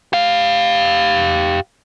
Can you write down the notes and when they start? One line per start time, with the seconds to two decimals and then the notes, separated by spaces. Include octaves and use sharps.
0.13 G4 F5